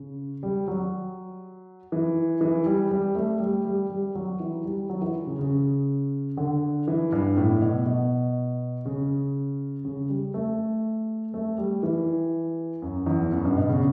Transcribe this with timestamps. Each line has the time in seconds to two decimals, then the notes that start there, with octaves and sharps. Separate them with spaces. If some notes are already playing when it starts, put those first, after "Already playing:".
Already playing: C#3
0.43 G3
0.68 F#3
1.92 E3
2.41 E3
2.66 G3
2.91 G3
3.15 A3
3.40 G3
3.65 G3
3.89 G3
4.15 F#3
4.40 E3
4.65 G3
4.89 F#3
5.02 E3
5.27 C#3
5.39 C#3
6.37 D3
6.87 E3
7.12 G2
7.37 A2
7.61 B2
7.86 B2
8.85 C#3
9.85 C#3
10.09 G3
10.34 A3
11.34 A3
11.58 G3
11.83 E3
12.82 F#2
13.06 E2
13.32 F#2
13.45 G2
13.57 B2
13.69 C#3